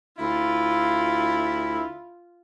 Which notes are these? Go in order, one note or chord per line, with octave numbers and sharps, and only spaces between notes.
D2 E4 F4